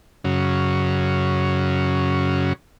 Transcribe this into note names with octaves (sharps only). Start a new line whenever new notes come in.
F#2 C#3